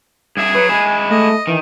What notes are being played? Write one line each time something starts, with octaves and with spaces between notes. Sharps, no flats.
G2 G#4 E5 G#6
F#3 B4
G#3 E4 G#5
A3 D#5
D#3 E3